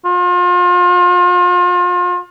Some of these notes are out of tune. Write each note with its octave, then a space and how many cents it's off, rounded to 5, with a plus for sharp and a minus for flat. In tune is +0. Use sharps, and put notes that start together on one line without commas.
F4 +35